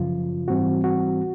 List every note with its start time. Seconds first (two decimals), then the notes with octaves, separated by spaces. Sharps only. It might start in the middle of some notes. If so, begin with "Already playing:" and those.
Already playing: F#2 C#3 F3 F4
0.48 G#2 E3 G3 C4 F#4
0.84 F#4